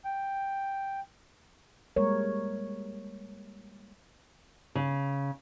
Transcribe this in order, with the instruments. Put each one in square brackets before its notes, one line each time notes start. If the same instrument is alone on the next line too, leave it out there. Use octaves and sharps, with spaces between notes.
[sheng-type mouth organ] G5
[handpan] G3 G#3 A#3 A#4 C#5
[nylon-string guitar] C#3